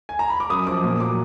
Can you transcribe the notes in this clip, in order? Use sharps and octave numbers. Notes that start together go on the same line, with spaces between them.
G#5
A#5
B5
D6
F#2 D#6
F3 D6
A#2 D#6
F#3 D6